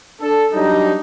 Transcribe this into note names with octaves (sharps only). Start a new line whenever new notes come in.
D4 A4
F#3 G3 D4 D#4